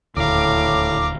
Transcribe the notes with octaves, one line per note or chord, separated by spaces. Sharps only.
D#1 D2 A2 F5 A#5 D6